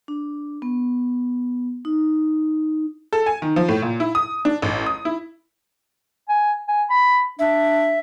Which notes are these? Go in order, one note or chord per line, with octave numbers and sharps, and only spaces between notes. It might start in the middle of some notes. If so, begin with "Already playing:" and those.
D4
B3
D#4
A4
G#5
D#3
F3
A2
A#2
E4
D#6
D4
A1
D#6
E4
G#5
G#5
B5
D4 E5